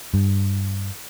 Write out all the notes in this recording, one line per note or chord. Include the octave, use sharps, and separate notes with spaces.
G2